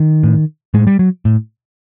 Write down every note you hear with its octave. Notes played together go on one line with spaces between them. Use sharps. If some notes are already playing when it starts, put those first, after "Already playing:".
Already playing: D#3
A2
A2 G#3
G3
F#3
A2